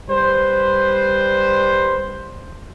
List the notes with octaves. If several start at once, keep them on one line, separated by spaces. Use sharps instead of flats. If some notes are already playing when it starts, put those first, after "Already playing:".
G3 B4 C5